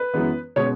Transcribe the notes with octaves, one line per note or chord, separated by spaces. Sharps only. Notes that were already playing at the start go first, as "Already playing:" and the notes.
Already playing: B4
F#2 E3 G#3 B3
B2 G#3 C#4 C#5